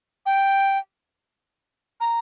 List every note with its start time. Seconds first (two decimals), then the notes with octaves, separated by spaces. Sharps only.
0.26 G5
2.01 A#5